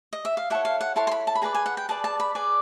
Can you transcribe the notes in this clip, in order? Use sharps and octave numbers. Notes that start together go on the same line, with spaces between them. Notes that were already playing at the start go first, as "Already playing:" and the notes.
D#5
E5
F5
E4 A4 C#5 F#5
F5
F#5
E4 A4 C#5 C6
C6
B5
A5
B5
G#4 B4 D5 A#5
G#5
F#5
G5
G#4 B4 D5 A5
A5
B5
G#4 B4 D5